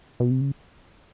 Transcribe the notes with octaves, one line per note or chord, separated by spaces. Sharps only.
B2
C3
C#3